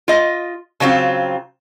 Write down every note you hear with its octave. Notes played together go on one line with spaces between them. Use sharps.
F4 D#5
C#3 F#3 C4 F4